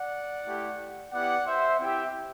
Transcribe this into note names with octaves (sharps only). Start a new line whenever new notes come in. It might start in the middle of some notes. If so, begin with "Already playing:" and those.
Already playing: D5 F#5
A3 E4 G4
B3 E4 G4 D5 F#5
C5 E5
C4 E4 G4 E5 G5